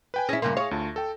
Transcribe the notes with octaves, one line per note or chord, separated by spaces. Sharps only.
B4 G5 G#5
C#4 E4 G#4 A#6
G2 C#3 A#3 C6
G#4 C#5 F5
D2 F4 A5
A4 G5